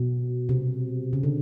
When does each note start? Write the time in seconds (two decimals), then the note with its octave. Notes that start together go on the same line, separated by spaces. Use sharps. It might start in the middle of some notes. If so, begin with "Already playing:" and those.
Already playing: B2
0.49 C3
1.13 C#3
1.23 D3